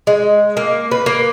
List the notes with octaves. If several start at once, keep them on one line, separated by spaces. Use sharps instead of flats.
G#3
A#3
B4
A#3